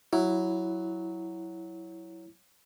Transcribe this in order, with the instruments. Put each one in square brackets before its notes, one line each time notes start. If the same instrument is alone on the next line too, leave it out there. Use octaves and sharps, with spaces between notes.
[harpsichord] F#3 [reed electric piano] E4